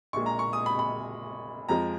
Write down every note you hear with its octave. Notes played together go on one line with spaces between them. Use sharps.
A#1 A#2 G#3 C#6
A#5
C#6
D#6
B5
B5
F2 F3 G#3 A#5